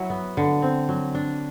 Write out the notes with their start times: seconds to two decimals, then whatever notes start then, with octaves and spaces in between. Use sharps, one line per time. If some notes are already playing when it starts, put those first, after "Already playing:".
Already playing: F#3 E4
0.10 B3
0.37 D3
0.62 C4
0.89 F#3
1.15 D4